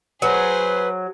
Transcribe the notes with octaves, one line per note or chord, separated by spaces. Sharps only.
F#3 G#4 B4 C5